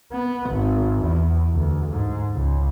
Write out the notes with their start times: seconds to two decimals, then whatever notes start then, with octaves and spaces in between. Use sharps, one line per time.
0.12 B3
0.50 G#1
1.03 E2
1.54 D2
1.91 G#2
2.35 C#2